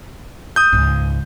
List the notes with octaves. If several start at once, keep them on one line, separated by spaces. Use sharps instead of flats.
D#6 G6
C#2 G#2